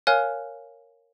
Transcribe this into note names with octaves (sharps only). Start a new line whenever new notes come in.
A#4 C#5 F5 G#5 F6 F#6